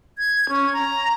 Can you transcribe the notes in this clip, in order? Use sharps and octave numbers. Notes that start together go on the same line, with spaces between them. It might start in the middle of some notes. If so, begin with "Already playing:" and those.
G#6
C#4
A#5